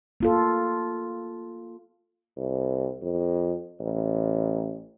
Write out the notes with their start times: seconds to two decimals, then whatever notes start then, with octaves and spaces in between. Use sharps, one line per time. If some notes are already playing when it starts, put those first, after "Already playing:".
0.20 A#3 F4 A4
2.37 C2
3.02 F2
3.80 A1